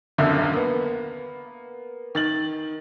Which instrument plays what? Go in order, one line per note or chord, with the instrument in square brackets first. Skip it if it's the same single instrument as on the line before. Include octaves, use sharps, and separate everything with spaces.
[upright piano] D#1 B1 F#2 D3 E5
A#3 B3
D#3 A6 F#7